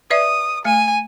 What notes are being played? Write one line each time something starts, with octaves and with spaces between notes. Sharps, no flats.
B4 D5 E5 D#6
A3 G#5